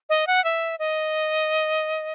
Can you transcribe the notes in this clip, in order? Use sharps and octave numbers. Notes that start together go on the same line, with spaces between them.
D#5
F#5
E5
D#5